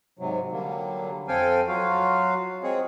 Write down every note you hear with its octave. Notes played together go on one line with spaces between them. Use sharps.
G#2 C3 F#3
D3 F#3 G3 A#3
F2 C4 A4 F5 G5 G#5
F#3 F4 F#4 F5
G#3 C4 G#4 C#5